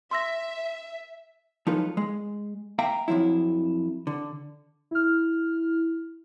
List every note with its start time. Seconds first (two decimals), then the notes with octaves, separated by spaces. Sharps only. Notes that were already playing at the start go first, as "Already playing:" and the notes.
0.11 E5 C6 E6 A#6
1.67 F3 F#3 D#4 F4 A4 B4
1.97 G#3
2.79 A#3 E5 F5 G5 A#5
3.08 F2 C3 F3 F#3 E4
4.07 D3
4.91 E4 F6